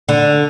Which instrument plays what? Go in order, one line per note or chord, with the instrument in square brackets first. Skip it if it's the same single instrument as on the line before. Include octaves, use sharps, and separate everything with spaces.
[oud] D3